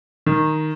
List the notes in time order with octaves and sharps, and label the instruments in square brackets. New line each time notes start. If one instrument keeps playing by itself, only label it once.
[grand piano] D#3